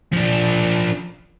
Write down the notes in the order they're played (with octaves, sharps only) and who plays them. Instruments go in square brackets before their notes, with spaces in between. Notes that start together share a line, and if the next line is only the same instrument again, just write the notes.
[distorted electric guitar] F3 D4